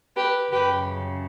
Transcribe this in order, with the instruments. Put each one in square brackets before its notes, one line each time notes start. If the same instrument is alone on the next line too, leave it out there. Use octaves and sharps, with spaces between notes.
[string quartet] G4 B4
F#2 C#3 G4 B4